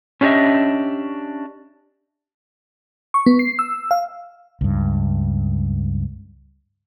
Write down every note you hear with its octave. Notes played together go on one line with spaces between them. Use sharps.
C#4 D4 G4 C#5 D#5 E5
C#6
B3
C7
E6
F5
C#2 G2